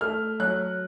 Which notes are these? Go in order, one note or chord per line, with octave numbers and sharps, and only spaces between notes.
A3 F6
F#3 F#6